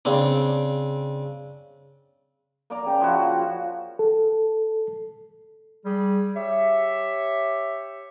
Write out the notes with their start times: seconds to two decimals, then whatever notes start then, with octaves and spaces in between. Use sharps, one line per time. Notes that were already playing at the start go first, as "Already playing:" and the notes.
0.05 C#3 C4 D4
2.70 A#3 D5 A#5
2.86 C#3 G5
3.01 F3 E4 F#4
3.99 A4
5.85 G3 G#4
6.37 G4 C#5 E5